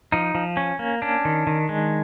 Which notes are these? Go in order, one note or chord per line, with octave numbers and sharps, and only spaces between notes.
F3 D#4
F3
C#4
A#3
C#4 D4
D#3
D#3
G#3